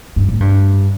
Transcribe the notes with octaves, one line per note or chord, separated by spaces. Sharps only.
G2
A2
G2